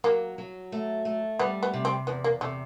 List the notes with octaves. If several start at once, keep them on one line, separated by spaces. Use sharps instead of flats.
F#3 A#3
F#3
A3
A3
G3 B3
B3
C3
C4
E2 B3
A#3
C3 A3